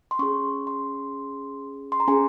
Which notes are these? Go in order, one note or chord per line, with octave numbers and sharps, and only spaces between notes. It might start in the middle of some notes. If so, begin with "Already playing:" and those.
C6
C#4 G#4 C#6
C6
C6
A#5
C#4 G#4 G#5